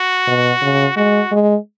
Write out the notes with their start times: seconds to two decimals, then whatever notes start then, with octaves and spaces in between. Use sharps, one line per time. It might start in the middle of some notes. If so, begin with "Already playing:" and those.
Already playing: F#4
0.27 B2
0.62 C#3
0.96 G#3 F#4
1.32 G#3